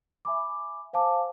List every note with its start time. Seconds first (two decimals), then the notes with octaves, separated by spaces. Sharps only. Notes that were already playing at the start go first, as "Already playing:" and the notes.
0.25 E5 G#5 B5 D6
0.93 C5 F5 G#5 A5 D6